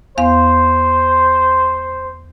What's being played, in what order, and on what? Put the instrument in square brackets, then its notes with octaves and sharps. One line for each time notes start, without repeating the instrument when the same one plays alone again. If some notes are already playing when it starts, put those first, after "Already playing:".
[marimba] E2 B3 F5 [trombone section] C5